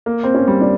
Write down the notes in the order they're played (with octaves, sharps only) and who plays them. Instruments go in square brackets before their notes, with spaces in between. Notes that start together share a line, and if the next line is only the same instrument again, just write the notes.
[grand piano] A#3
[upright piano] C4
C#4
[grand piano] G3
[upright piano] D4